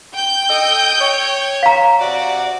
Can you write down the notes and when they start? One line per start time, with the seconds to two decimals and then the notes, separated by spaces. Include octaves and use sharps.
0.13 G5 G6
0.49 A4 D#5
0.99 C#5
1.63 F5 A#5
2.00 C3 F#4 D5